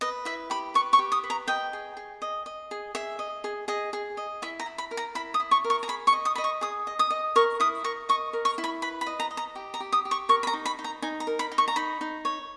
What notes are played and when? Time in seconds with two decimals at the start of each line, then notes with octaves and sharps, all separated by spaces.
0.01 B4 D#5
0.25 E4 E5
0.50 G4 B5
0.74 B4 C#6
0.93 C#6
0.99 G4
1.12 D#6
1.24 B4
1.30 A#5
1.48 D#5 G5
1.73 G#4
1.97 G#4
2.22 D#5
2.46 D#5
2.71 G#4
2.95 G#4 E5
3.19 D#5
3.44 G#4
3.68 G#4 D#5
3.93 G#4
4.17 D#5
4.42 E4 E5
4.60 A#5
4.66 E4
4.78 B5
4.91 A#4
4.97 A#5
5.15 E4 B5
5.34 D#6
5.40 E4
5.51 C#6
5.64 A#4
5.70 C#6
5.83 A#5
5.88 G#4 B5
6.07 C#6
6.13 D#5
6.25 D#6
6.35 D#5 B5
6.44 C#6
6.61 G#4 D#6
6.87 D#5
6.99 D#6
7.10 D#5
7.36 A#4 C#6
7.60 E4 D#6
7.84 A#4 C#6
8.09 D#5 C#6
8.33 A#4
8.45 C#6
8.58 E4
8.64 B5
8.82 B4 B5
9.01 B5
9.07 D#5
9.20 A#5
9.31 D#5
9.37 A#5
9.56 G4
9.74 A#5
9.80 G4
9.92 D#6
10.05 G4
10.11 C#6
10.29 A#4 C#6
10.43 B5
10.47 A#5
10.53 D#4
10.66 B5
10.79 D#4
10.84 A#5
11.02 D#4 G#5
11.20 A#5
11.27 A#4
11.39 B5
11.52 D#4
11.58 C#6
11.68 A#5
11.76 D#4 B5
12.01 D#4
12.25 C#5